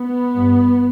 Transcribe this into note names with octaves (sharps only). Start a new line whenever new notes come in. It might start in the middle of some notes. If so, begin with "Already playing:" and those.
Already playing: B3
G2